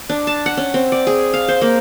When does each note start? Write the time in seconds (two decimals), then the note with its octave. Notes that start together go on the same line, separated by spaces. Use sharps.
0.09 D4
0.27 A5
0.46 F#5
0.57 C#4
0.74 C4
0.92 D5
1.07 G#4
1.34 F5
1.48 C5
1.62 A#3